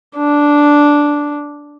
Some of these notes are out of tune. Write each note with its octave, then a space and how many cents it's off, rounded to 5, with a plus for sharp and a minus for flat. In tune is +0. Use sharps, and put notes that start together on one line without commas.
D4 -5